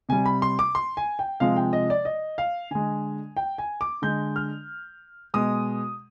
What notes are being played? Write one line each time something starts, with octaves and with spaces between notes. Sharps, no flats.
C3 G3 G#5
B5
C6
D6
C6
G#5
G5
C3 F3 G#3 F5
G5
D#5
D5
D#5
F5
D3 G#3 G#5
G5
G#5
D6
D3 G#3 G6
F6
B2 G#3 D#6